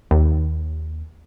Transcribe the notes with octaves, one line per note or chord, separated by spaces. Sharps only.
D#2